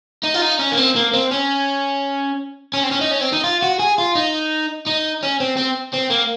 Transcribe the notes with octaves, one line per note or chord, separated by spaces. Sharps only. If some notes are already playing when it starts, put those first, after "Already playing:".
D#4
F4
D#4
C#4
A#3
C4
A#3
C4
C#4
C#4
C4
C#4
D#4
C#4
C4
D#4
F4
F#4
G#4
F4
D#4
D#4
C#4
C4
C4
C4
A#3